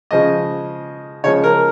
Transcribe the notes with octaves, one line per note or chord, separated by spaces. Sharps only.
C#3 F3 G#3 D#5
C#3 F3 G#3 C#5
A#4